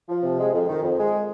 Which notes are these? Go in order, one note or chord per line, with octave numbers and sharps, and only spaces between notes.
F3
C3
G#3
F2
D#3
F2
G#3